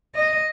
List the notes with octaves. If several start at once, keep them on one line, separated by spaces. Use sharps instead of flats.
D#5